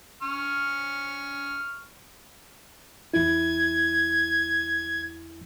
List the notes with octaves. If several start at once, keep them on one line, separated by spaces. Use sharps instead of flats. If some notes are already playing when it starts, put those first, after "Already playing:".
C#6 F6
E2 E4 G#6